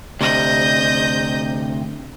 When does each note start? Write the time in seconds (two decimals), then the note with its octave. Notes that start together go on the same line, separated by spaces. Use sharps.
0.21 D2 C3 D#5 G6